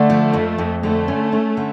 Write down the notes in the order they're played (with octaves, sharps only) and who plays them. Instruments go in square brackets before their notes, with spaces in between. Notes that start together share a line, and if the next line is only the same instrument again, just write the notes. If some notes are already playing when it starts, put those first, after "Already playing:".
Already playing: [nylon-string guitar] D3 [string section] A3
[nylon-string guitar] F3
F2
F2
[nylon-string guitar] D3 [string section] A3
[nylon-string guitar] C#4
C#4
D3